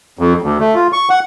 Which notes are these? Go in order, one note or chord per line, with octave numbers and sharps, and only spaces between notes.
F2
D2
A3
F4
C#6
F#5